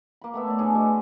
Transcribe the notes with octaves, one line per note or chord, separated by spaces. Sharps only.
A#3 B5
A3 B3 E5
C#5 D5
A2 D4 G#4 A4
G#3 B3 F#4